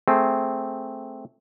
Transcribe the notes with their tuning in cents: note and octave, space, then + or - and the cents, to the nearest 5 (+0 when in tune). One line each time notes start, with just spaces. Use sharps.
A3 +0 C4 +0 G#4 +5